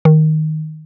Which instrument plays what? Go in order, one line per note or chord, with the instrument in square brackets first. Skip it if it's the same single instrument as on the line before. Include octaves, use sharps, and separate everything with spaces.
[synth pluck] D#3